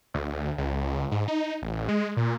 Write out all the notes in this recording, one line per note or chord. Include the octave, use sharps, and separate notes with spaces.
D2
C#2
G#2
D#4
A1
G#3
A#2